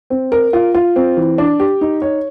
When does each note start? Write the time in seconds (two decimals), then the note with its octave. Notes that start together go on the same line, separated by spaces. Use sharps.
0.10 C4
0.32 A#4
0.53 F4
0.75 F4
0.96 C4
1.17 E3
1.38 D4
1.60 G4
1.81 D#4
2.02 C#5